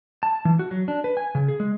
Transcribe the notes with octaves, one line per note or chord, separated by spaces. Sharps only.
A5
E3
F#4
F#3
D4
B4
G#5
C#3
G#4
G#3